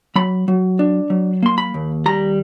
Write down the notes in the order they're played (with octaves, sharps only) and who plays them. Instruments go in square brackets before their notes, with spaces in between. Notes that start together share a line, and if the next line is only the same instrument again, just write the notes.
[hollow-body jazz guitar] F#3 B5
F#3
D4
F#3
A#3 C6
B5
D#2
G3 A#5